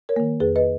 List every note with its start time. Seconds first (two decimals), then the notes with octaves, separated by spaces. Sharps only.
0.09 A#4 C#5
0.16 D#3 A#3
0.40 F2 G#4 B4
0.56 B4 D#5